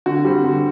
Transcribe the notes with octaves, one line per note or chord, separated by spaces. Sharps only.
D3 F#4
G3 C4
D3